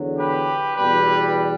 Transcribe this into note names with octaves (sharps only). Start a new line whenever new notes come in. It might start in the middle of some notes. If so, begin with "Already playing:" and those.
Already playing: E2 D3 F#3
G4 B4
E2 B2 G3 G4 B4